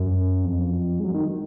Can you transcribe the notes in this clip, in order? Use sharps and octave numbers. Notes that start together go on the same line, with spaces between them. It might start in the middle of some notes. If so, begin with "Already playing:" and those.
Already playing: F#2
F2
G#2
F#2
D#3